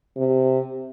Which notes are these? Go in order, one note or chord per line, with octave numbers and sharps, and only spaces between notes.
C3